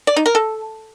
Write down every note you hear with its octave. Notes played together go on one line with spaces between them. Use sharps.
D5
D#4
A#4
A4